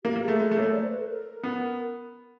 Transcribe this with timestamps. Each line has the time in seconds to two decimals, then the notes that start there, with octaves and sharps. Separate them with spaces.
0.04 A#3 G4
0.16 A#3
0.22 G#4
0.28 A3
0.39 G#3 A4
0.51 A3
0.57 A#3 C#5
0.62 A3
0.74 D5
0.82 C5
0.91 B4
0.99 A4
1.09 A#4
1.44 B3